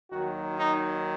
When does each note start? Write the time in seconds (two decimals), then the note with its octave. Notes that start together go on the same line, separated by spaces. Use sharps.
0.11 D#2 D#3 F#3 F#4
0.57 D#4